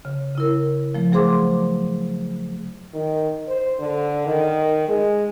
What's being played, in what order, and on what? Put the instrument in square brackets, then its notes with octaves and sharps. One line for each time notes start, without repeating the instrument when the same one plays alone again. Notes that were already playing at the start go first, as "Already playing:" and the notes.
[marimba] C#3
C#3 E4 A#4
F3 A3
F#3 G#4 C5 C6 D6
[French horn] D#3
C5
D3
D#3
G#3